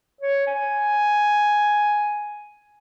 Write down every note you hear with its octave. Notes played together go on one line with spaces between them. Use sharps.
C#5
G#5